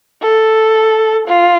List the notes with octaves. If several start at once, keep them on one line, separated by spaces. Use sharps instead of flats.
A4
F4